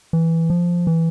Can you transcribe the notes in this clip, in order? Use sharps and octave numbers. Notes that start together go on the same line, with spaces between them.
E3
F3
E3